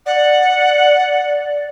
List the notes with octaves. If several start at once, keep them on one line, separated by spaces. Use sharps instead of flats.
D5 F#5